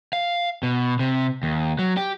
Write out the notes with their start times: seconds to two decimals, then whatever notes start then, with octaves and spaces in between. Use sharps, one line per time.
0.13 F5
0.63 B2
0.99 C3
1.43 D#2
1.79 F#3
1.97 G4